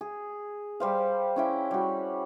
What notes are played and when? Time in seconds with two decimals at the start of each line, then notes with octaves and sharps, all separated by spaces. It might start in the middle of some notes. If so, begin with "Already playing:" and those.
0.01 G#4
0.80 G3 C5 F5
1.36 C#4 E4 G5
1.71 G3 F#4